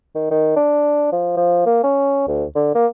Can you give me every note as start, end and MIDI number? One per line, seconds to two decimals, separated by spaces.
0.15 0.27 51
0.31 0.51 51
0.56 1.12 62
1.12 1.36 53
1.37 1.66 53
1.66 1.79 58
1.84 2.25 61
2.28 2.44 38
2.55 2.74 50
2.75 2.87 58